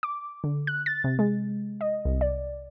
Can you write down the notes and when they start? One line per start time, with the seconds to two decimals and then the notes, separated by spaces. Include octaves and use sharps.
0.03 D6
0.44 D3
0.67 F#6
0.86 A6
1.04 C3
1.19 G#3
1.81 D#5
2.05 C2
2.21 D5